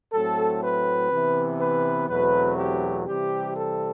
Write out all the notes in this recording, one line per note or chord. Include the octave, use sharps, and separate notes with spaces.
A2 F#3 A3 C4 A4
B4
C3 E3 B3
B4
E2 B2 F#3 A3 C4 B4
G4
C3 E3 G3 C4 G4
A4